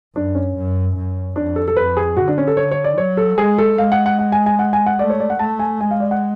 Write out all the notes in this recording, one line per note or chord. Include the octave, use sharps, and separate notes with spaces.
F#2 D4
C#4
F#2
F#2
F2 D4
A4
A4
F2 B4
G#4
D3 F#4
D4
C#4
A4
D3 C#5
C#5
D5
F#3 C#5
A4
G#3 G#4
A4
G#3 F5
F#5
F#5
F#5
G#5
G#5
F#5
G#5
F#5
A3 D5
C#5
D5
F#5
A3 A5
G#5
G#3 G#5
F5
D5
F#5